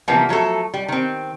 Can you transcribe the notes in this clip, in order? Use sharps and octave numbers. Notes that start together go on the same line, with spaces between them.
C3 E3 F3 G3 A#3 B3
F3 F#3 A3 A4
G3
D#3 C4